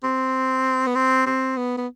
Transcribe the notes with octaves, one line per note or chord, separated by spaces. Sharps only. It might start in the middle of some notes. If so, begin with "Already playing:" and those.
C4
B3
C4
C4
B3
B3